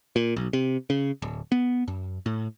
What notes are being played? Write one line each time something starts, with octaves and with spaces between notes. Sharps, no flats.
A#2
B1
C3
C#3
D1
B3
F#2
A2